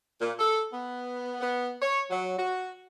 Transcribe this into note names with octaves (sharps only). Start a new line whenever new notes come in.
A#2
A4
B3
B3
C#5
F#3
F#4